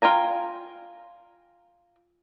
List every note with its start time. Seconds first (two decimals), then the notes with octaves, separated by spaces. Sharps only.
0.02 F4 G5 G#5 A#5